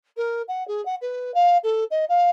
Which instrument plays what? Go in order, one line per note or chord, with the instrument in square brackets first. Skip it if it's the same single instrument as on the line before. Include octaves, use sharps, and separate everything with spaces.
[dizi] A#4
F#5
G#4
F#5
B4
F5
A4
D#5
F5